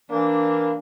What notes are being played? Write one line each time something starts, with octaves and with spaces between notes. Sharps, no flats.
E3 A#3 D4